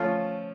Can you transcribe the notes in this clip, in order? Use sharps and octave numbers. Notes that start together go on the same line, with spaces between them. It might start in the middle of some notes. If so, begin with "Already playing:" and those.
Already playing: F3 A3 C#4 F4